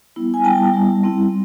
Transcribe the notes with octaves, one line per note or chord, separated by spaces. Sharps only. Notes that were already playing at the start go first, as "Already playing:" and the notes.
G3 B3 E4
G#5
G3 B3 E4 G5 A5
G3 B3 E4
G3 C4 E4